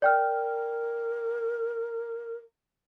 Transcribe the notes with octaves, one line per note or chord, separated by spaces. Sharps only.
A#4 D5 G5 F6